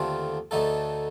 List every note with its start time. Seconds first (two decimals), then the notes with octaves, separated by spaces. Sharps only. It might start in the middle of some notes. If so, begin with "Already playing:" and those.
Already playing: D#2 D3 A3 C4 F4
0.51 D2 D3 A3 D#4 A4